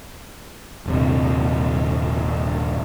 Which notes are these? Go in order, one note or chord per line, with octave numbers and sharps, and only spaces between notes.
D#1 G2 C3